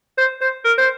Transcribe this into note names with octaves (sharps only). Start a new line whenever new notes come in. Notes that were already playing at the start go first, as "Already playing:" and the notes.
C5
C5
A#4
C5